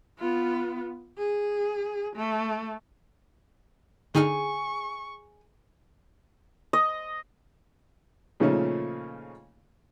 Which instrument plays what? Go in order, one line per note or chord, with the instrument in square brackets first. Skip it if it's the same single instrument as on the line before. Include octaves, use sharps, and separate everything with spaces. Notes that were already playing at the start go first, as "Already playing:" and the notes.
[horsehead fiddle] B3 F4
G#4
A3
[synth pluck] D3 D#4 F6 [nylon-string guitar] G#4 G#5 [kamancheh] C#6
[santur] D#5
[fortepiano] A#2 C#3 F3 A3 C#4 D#4